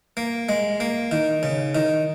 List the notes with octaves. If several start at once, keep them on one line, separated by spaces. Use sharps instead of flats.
A#3
G#3
A#3
D#3
C#3
D#3